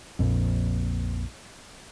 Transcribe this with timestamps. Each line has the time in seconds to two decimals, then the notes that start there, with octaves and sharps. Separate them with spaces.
0.19 A#1 F2